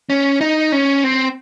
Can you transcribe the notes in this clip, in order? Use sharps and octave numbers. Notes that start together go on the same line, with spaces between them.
C#4
D#4
C#4
C4